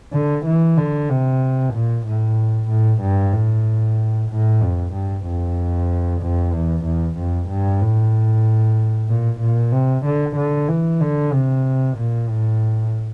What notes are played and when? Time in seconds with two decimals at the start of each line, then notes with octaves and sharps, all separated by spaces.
0.13 D3
0.46 E3
0.78 D3
1.10 C3
1.74 A#2
2.06 A2
2.69 A2
3.02 G2
3.33 A2
4.30 A2
4.62 F2
4.93 G2
5.26 F2
6.21 F2
6.53 E2
6.85 E2
7.17 F2
7.49 G2
7.81 A2
9.08 A#2
9.41 A#2
9.72 C3
10.05 D3
10.37 D3
10.69 E3
11.01 D3
11.33 C3
11.97 A#2
12.29 A2